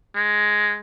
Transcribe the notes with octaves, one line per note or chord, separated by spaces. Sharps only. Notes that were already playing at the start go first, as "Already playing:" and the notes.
G#3